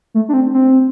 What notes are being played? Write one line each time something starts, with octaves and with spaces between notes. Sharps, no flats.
A3
D4
C4
C4